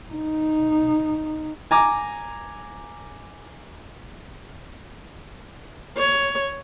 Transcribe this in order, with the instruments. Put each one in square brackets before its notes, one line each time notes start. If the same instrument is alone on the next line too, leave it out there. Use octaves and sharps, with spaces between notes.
[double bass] D#4
[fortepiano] G#5 A#5 D6
[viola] C#5